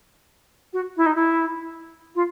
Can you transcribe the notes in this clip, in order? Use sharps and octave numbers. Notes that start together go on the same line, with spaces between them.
F#4
E4
D#4
E4
F4